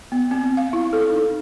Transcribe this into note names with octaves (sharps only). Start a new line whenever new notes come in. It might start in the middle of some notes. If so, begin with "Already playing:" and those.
B3
C4
F5
E4
A4
D#4